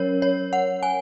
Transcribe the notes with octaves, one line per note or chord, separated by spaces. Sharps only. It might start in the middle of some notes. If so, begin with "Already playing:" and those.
Already playing: F#3 C#4 A#4 C#5
C#5
F#5
G#5